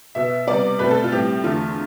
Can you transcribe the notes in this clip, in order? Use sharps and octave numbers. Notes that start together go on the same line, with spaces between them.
B2 B3 E5
C3 G3 B3 D5
B2 A3 C4 B4
A4
F4
A2 G3 C4 G4
E2 D3 A3 F4